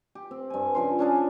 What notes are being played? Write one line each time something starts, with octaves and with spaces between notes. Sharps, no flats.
G4
C4
G2 G#5
C#3 F3 C6
C#4 D4 G#4 F5